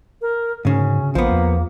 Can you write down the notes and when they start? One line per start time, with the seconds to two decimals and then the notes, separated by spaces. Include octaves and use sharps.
0.21 A#4
0.65 D2 G#2 C#3 C#4
1.15 A#1 F3 A#3 B3
1.31 E2